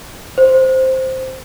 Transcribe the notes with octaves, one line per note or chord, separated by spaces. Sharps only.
C5